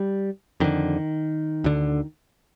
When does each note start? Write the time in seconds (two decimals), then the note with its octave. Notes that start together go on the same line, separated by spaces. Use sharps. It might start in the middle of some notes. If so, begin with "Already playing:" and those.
Already playing: G3
0.60 F2 D3 D#3
1.64 D2 D3